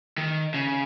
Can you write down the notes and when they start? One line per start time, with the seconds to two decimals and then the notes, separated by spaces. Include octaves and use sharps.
0.18 D#3
0.54 C#3